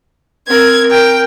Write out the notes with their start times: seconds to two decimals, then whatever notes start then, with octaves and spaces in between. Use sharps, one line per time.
0.48 C4 A#4 G#6
0.90 A#4 G5